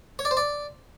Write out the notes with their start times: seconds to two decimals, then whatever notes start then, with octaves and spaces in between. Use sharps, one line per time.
0.19 C#5
0.25 D5
0.31 C5
0.37 D5